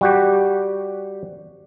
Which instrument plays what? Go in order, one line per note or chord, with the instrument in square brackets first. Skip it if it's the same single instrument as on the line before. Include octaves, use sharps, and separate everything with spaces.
[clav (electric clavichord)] G3 F#4 G4